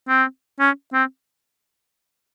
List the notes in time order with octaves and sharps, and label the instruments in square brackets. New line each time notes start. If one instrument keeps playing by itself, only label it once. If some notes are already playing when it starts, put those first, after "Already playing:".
[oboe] C4
C#4
C4